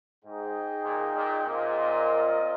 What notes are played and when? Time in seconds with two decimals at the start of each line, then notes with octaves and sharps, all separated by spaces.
0.24 G#2 D#4 G#4 D#5 G5
0.85 A#2
1.15 A#2
1.46 A#2 C4 F4 A#4 D#5